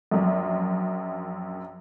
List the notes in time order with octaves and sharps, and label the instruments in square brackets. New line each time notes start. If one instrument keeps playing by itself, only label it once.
[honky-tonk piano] A#1 F#2